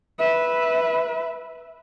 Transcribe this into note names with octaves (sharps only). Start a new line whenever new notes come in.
B4 E5